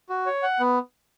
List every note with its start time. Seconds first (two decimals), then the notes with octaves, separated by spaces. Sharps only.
0.10 F#4
0.26 C#5
0.43 F#5
0.60 B3